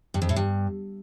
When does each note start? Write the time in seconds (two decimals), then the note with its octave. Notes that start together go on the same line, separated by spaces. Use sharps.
0.14 G2
0.22 F2
0.29 A2
0.36 G2